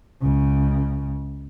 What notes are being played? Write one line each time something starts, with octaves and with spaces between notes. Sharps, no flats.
C#2 C#3